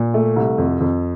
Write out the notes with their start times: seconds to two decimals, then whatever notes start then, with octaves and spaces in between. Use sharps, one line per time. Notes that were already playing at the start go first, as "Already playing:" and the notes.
Already playing: A#2
0.14 A3
0.36 C2
0.58 F2
0.80 F2